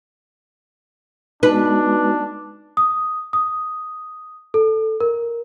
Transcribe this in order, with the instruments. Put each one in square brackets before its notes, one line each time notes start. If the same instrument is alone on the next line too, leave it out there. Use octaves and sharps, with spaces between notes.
[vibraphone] G#3 B3 F#4 [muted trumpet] D4 [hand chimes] D#4 [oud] B4
[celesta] D#6
D#6
A4
A#4